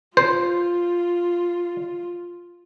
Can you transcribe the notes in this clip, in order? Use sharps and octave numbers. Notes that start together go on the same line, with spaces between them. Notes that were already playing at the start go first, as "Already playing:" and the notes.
F4 C5